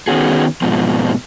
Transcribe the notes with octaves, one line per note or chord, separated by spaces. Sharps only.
D#3 B3 C#4 F#4 G#4
G#2 B2 F3